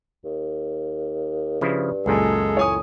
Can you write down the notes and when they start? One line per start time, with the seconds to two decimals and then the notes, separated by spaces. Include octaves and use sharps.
0.24 D#2
1.61 G2 C#3 F3 E4
2.06 C#2 F#2 A#2 G#3 G#4 A4
2.57 A2 C#5 G#5 D#6